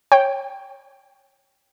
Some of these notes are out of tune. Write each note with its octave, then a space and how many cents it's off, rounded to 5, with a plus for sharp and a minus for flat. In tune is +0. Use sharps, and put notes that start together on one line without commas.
C#5 -15 G5 +0